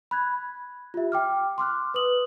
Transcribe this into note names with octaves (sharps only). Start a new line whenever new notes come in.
B5 F#6 G#6
F4 G4 E5
G5 D6 F6
C6 D6 F6 F#6
B4 D#6 F#7